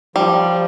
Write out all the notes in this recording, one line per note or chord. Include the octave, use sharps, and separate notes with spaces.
F3 G3